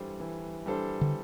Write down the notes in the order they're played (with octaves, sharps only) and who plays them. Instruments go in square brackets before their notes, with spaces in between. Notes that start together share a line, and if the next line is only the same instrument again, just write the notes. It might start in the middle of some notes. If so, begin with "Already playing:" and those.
Already playing: [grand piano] E3 G3 D4 A4 C5
E3
G3 D4 A4 C5
[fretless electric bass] D3